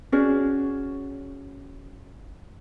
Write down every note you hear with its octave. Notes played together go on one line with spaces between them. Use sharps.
C#4 F#4 G#4 D5